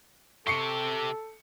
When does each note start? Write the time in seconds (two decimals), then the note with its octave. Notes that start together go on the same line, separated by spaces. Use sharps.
0.47 C3 G4 A4 C#6 C7 C#7